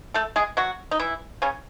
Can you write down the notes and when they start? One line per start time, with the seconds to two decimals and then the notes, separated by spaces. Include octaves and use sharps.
0.14 A3 A4
0.36 G#3 G#4
0.57 F#3 F#4
0.91 D#4
0.99 E3 E4
1.42 C#3 C#4